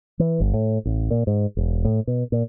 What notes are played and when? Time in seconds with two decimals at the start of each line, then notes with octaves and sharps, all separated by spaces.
0.19 E3
0.40 G1
0.54 A2
0.85 A1
1.11 A#2
1.27 G#2
1.57 E1
1.85 A2
2.07 B2
2.32 A#2